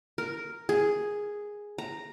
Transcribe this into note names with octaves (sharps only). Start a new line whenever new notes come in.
A#4
G#4
A#5